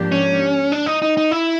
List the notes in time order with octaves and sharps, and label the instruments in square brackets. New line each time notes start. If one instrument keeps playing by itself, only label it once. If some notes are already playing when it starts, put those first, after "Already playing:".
Already playing: [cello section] G#2 F3 A#3 D4 G4
[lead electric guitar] C#4
D4
D#4
D#4
D#4
E4